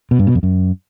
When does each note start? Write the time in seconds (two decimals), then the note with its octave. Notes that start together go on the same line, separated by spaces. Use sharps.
0.11 B2
0.19 G2
0.27 B2
0.35 F2
0.43 F#2